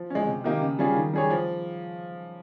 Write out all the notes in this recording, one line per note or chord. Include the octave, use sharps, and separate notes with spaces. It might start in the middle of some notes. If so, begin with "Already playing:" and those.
Already playing: F3
G#3 C#4
C3
D#3 A#3 D#4 G4
C#3
G3 C#4 F4 G#4
D#3
G3 C#4 G#4 C#5
F3